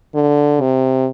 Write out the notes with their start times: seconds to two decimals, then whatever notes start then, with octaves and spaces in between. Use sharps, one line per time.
0.15 D3
0.61 C3